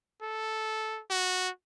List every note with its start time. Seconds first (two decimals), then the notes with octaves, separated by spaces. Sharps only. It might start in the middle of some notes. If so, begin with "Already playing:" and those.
0.22 A4
1.10 F#4